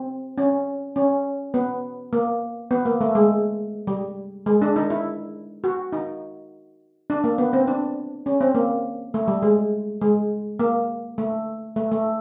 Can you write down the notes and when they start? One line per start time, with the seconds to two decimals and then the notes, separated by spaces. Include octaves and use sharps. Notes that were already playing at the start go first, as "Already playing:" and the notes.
Already playing: C4
0.38 C#4
0.96 C#4
1.54 B3
2.13 A#3
2.71 B3
2.85 A#3
3.01 A3
3.15 G#3
3.87 G3
4.46 G#3
4.62 D4
4.76 D#4
4.90 E4
5.64 F#4
5.93 D#4
7.10 D4
7.24 A#3
7.38 B3
7.53 C4
7.67 D4
8.26 C#4
8.41 C4
8.55 A#3
9.14 A3
9.28 G3
9.43 G#3
10.01 G#3
10.60 A#3
11.18 A3
11.76 A3
11.91 A3